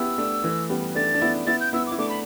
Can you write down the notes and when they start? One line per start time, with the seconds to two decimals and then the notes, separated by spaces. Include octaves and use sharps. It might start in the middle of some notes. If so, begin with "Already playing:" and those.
Already playing: B3 E4 G4 E6
0.18 A3 D4
0.44 E3 A3
0.70 G3 B3
0.95 A3 D4 A6
1.14 D4
1.21 B3 E4
1.46 B3 E4 A6
1.60 G6
1.73 B3 E4 E6
1.86 D6
1.92 E4
1.98 A3 D4 D6
2.09 B5